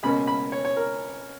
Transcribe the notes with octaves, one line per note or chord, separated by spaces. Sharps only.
C#2 B2 A#3 C#4 B5
B5
C#5
C#5
A#4